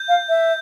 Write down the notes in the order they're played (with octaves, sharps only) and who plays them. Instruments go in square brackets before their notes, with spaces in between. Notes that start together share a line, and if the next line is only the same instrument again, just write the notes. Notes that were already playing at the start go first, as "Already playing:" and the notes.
Already playing: [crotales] G6
[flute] F5
E5